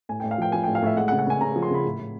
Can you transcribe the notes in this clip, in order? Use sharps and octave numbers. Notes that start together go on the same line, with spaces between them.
A2 G#5
G5
A2
F5
F3 G5
F3 G#5
G5
A2
F5
A2 E5
G#3 F#5
F#5
C#3
F#5
C#3 G#5
C#3 A#5
F3
C6
C#3 B5
A2
A2